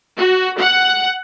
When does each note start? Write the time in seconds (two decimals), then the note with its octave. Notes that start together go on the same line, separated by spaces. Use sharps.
0.17 F#4
0.60 F#5